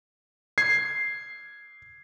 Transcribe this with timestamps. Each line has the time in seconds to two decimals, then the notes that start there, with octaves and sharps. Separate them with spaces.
0.58 G#6 C7